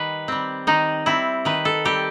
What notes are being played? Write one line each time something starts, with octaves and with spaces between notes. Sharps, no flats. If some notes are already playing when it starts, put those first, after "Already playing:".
Already playing: D#3 G3 B4
G3 C4
D#3 D#4
G3 C4 E4
D#3 B4
A4
G3 C4 G4